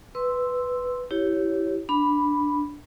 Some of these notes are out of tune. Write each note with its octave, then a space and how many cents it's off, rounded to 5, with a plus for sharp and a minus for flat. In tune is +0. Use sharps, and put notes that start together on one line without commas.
B4 +5 C6 +0 E6 +0
E4 +0 G4 -15 C#5 -5
D4 +0 B5 +0